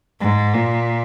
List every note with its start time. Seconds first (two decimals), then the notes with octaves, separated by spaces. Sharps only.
0.20 G#2
0.54 A#2